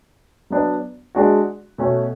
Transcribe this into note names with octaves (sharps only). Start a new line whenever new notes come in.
F#3 B3 D4
G#3 D4 F#4
B2 A3 C#4